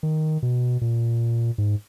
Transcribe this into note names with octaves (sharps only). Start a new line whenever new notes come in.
D#3
B2
A#2
G#2